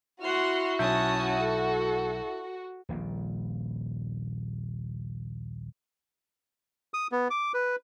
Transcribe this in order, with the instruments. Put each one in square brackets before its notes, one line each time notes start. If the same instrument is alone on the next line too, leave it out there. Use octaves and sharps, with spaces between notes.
[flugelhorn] E4 [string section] F#4 [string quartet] F#5 C6 F6
[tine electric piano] B1 E5 G6 [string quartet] C#4 A5 D#6
[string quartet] A4
[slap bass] D#1 A#1 A#2
[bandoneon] D#6
B3
D6
B4